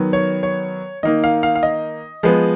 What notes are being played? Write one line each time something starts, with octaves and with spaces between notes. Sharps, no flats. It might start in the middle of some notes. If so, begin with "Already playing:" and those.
Already playing: D#3 F#3 B3
C#5
C#5
D#3 A#3 D#4 D#5
F5
F5
F5
D#5
F3 G#3 B3